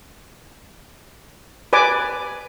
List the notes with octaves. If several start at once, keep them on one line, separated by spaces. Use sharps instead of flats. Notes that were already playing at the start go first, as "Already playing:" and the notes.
B4 D5 G#5 D6